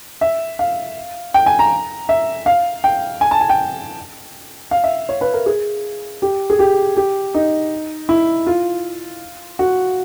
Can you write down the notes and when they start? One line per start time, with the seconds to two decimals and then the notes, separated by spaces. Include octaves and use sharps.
0.21 E5
0.59 F5
1.34 G5
1.46 G#5
1.59 A#5
2.09 E5
2.46 F5
2.84 G5
3.21 G#5
3.31 A5
3.41 G#5
3.49 G5
4.71 F5
4.84 E5
5.09 C#5
5.21 B4
5.34 A#4
5.46 G#4
6.22 G4
6.50 G#4
6.59 G4
6.97 G4
7.34 D#4
8.09 E4
8.47 F4
9.59 F#4